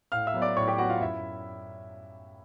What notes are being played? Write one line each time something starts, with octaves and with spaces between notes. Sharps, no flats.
A2 F5 F6
E5 E6
F#3 B3
D5 D6
A2 C#5 C#6
G4 G5
F#3 B3 F#4 F#5
F4 F5
F#2 E4 E5